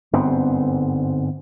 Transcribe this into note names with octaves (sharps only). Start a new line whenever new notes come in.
G1 G#2 B3 C4